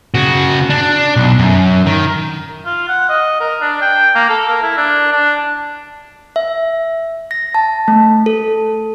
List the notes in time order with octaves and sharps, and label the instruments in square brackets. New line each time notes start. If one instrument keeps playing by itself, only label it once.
[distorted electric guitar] C#3 F#4
D4
B1
F#2
D#3
[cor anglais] F4
F#5
D#5
A#4
D4
G5
A#3
A4
A#4
E4
D4
D4
[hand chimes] E5
A#6
A5
A3
A4